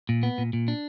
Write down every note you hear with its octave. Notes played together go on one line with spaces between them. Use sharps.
A#2
B3
A#2
A#2
D4